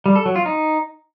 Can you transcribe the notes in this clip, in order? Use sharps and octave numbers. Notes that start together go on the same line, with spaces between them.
G3
A4
F#3
F4
D#4